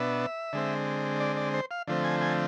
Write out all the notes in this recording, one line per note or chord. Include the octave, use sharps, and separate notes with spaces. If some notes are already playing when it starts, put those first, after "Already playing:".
Already playing: B2 B3 D4 E5
D3 G#3 C4
D5
D5
C5
F5
D3 F3 A3 C4
G#5
G#5